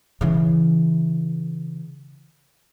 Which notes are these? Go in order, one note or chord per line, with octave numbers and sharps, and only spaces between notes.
C#3 E3